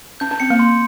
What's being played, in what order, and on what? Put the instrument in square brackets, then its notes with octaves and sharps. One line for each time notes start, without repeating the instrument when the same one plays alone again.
[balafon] C#4 [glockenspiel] G6
[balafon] C#4
[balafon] C4 [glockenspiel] C#7
[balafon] A#3
[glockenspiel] C6